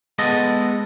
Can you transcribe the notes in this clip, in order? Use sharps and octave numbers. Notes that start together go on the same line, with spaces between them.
G#3 B3 A4 D#5